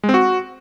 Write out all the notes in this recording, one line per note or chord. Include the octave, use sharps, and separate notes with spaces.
G#3
C4
F#4